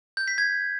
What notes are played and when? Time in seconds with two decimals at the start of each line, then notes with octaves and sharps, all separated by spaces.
0.17 G6
0.28 B6
0.38 G#6